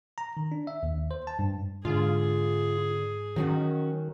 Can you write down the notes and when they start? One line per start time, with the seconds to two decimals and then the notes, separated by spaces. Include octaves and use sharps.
0.18 A#5
0.37 D#3
0.52 D4
0.67 E5
0.83 D#2
1.11 C5
1.27 A5
1.39 G2
1.85 G#2 D3 F4 G#4
3.36 D#3 F#3 C#4 F#4